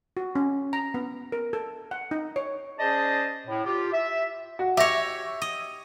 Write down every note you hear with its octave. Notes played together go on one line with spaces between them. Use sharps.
F#4
C#4
A#5
B3
A#4
A4
F#5
D#4
C#5
C#4 G#4 C5 D5 D#5 A5
A2
F4 G4
E5
F#4
G4 C#5 E5 A#6
D#5